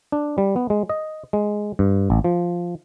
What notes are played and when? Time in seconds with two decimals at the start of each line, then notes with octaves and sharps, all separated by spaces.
0.12 D4
0.38 G3
0.56 B3
0.70 G#3
0.89 D#5
1.33 G#3
1.79 G2
2.10 A1
2.24 F3